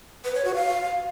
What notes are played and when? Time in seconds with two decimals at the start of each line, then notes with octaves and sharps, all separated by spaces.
0.25 B4
0.35 C#5
0.45 F#4
0.55 F5